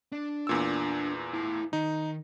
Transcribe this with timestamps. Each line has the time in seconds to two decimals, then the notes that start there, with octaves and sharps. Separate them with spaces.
0.12 D4
0.47 E2 A#2 E6
1.34 E4 A5
1.73 D#3 D#4